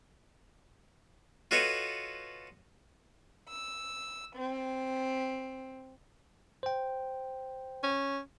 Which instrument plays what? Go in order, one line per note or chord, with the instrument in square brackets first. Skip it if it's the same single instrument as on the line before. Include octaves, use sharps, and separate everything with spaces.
[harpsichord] F4 F#4 A4 B4 C#5 D#5
[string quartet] E6
C4
[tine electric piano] C5 G5
[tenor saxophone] C#4